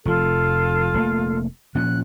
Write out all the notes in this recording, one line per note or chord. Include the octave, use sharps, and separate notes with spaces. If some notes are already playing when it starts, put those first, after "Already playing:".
F1 F3 F4 A4
F1 A3 A#3
A#2 F3 C#4 F#6